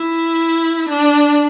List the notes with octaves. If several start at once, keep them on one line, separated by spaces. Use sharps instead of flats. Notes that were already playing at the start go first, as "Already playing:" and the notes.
Already playing: E4
D4